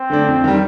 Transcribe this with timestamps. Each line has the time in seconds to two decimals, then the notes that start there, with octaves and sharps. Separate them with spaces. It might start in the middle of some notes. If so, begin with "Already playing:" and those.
Already playing: C4
0.10 D3 A3 D4
0.28 F2
0.44 D#3 G3